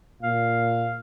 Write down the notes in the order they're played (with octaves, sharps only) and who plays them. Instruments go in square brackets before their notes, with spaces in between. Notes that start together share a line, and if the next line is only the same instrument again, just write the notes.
[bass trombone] A#2 [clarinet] F5